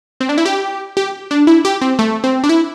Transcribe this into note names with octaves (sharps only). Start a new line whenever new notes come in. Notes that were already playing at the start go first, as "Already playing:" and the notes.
C4
D4
E4
G4
G4
D4
E4
G4
C4
A3
C4
D4
E4